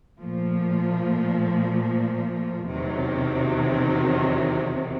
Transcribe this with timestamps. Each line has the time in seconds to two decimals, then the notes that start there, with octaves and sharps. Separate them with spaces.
0.19 A#2 F3 A3
2.68 E2 C3 D#3 F#3